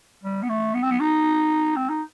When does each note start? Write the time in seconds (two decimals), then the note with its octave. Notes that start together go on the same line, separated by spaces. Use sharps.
0.23 G3
0.43 B3
0.49 A3
0.74 B3
0.83 C4
0.91 B3
1.00 D#4
1.76 C4
1.89 D#4